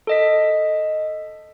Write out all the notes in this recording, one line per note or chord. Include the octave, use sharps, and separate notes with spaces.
A4 D#5 B6